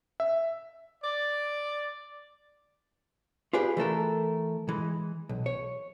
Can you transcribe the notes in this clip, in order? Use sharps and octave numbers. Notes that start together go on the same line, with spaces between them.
E5
D5
F4 G4 G#4 B4 D5
E3 A3 A4 A#4
E3 G#3
B1
C#5